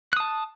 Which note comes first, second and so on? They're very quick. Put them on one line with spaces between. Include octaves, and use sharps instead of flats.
F#6 D#6 A5